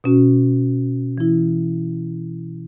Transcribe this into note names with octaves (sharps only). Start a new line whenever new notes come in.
B2 C#4 F#4
E3 E4